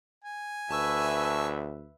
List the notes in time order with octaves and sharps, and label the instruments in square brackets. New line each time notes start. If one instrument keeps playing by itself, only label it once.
[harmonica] G#5
[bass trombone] D2 [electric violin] B4 E5 [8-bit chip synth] A5 C#6 E6